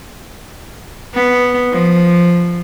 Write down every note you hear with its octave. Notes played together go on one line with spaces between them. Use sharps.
B3
F3